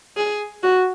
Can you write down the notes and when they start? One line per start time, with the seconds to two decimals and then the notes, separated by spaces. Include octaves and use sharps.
0.17 G#4
0.63 F#4